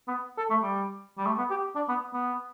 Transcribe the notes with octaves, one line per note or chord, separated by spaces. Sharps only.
B3
A4
A3
G3
G3
A3
B3
G4
D4
B3
B3